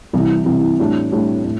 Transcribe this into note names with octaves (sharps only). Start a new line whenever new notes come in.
C2 C3 E3
C2 C3 E3
A2 G3 D4
A2 G3 D4
A2